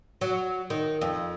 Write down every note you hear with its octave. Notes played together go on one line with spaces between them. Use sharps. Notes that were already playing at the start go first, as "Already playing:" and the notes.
F#3
D#3
F2